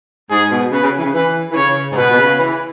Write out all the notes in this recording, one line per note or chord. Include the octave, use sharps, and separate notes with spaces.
G#2 G#4
B2
C#3 B4
C#3
E3
C#3
E3 B4
E3
C#3 C#5
G#2
B2 B4
B2
C#3
E3